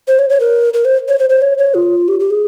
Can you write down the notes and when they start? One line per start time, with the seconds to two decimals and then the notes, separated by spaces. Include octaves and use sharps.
0.08 C5
0.19 C#5
0.30 C#5
0.40 A#4
0.74 A#4
0.85 C5
1.08 C#5
1.19 C5
1.29 C5
1.42 C#5
1.58 C#5
1.74 F4
2.08 G4
2.20 G4
2.30 G#4